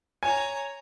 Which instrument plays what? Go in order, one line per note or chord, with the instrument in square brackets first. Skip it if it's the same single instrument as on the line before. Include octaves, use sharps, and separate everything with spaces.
[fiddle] C#5 A#5 [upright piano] G#5